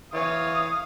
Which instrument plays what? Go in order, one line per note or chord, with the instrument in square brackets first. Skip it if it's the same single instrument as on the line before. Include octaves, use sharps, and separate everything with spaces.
[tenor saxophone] E3 [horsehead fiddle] C#5 [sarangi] F5 [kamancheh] D#6